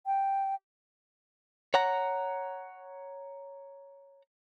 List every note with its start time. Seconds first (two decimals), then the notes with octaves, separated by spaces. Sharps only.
0.06 G5
1.74 C#5 F#5 A#5